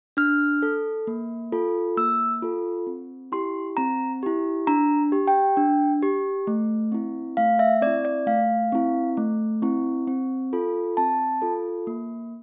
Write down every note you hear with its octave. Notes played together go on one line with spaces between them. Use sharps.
D4 F6
A4
A#3
F4 A4
A#3 E6
F4 A4
C4
E4 G4 C6
C4 A#5
E4 G4
D4 A#5
G4
G5
D4
G4
A3
C4 E4
A3 F5
E5
C4 E4 D5
D5
A3 F5
C4 E4
A3
C4 E4
C4
F4 A4
C4 A5
F4 A4
A#3